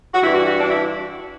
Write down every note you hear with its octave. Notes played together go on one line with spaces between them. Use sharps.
F#4
G2 E3 G3 E4
F#4
F#4
D4
E4